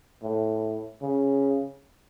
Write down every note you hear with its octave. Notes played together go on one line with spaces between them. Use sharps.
A2
C#3